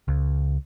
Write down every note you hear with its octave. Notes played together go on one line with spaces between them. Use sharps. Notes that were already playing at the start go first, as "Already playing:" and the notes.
C#2